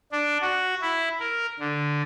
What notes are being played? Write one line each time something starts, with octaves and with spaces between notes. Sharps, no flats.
D4
F#4
E4
A#4
D3